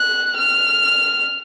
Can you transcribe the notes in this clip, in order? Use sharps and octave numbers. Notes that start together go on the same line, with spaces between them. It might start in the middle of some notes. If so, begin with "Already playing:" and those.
Already playing: F#6
F6